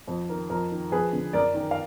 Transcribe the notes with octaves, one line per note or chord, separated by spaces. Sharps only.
F2
D#3 A#4
F2 A#4
D#3
F2 G#4 B4
D3
F#2 A#4 D5
D#3
F5